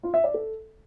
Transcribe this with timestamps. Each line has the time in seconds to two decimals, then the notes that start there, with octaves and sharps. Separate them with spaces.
0.03 F4
0.14 E5
0.24 D5
0.34 A4